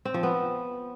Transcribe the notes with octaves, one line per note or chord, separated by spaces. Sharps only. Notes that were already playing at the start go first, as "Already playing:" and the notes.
C4
F3
B3